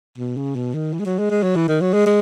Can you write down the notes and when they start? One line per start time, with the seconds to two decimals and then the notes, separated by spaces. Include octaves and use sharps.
0.18 B2
0.37 C#3
0.56 B2
0.74 D#3
0.93 E3
0.99 G#3
1.06 F#3
1.19 G#3
1.30 G#3
1.43 F#3
1.56 E3
1.68 D#3
1.81 F#3
1.93 G#3
2.06 G#3